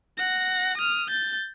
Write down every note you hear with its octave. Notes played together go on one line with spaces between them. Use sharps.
F#5 A#6
D#6 F6
G6 A6